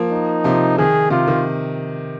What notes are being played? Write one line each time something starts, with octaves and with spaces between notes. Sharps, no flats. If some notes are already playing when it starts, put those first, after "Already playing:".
Already playing: F3 A#3
D#4
C3 F3
D#3 G#4
C3 F4
D#3